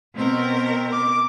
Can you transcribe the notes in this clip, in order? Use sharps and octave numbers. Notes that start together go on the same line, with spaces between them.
B2 C4 A#4
D6